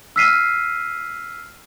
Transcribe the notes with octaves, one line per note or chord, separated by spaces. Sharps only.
E6 F6 B6 C7 D#7